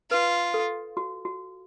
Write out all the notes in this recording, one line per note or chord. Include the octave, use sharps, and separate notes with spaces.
F4 B4
A4
F#4
F#4